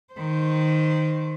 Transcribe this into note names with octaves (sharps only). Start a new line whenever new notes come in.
D#3 C5